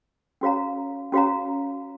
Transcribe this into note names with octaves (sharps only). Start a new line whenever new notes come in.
C#4 F#4 C#5 F5 A#5
C#4 F#4 C#5 F5 A#5